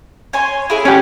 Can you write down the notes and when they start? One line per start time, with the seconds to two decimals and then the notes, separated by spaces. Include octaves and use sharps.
0.33 C#5 G#5 C6
0.70 E4 G#4 G#5
0.85 C#4 G4 C#5 F#5